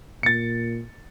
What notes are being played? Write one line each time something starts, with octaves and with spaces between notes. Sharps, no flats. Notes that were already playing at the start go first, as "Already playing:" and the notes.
A#2 A6 C#7